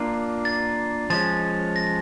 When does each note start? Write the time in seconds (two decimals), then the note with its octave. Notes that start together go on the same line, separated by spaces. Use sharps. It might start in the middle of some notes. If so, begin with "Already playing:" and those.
Already playing: A#3 D4 F4
0.45 A6
1.10 F3 G#3 C#4 A6
1.76 A#6